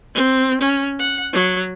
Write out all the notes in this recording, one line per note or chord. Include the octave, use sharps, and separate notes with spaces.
C4
C#4
F#5
F#3